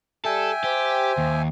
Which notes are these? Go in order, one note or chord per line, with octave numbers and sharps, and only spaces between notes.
G3 A4 E5 G5 G#5
G4 C5
D#2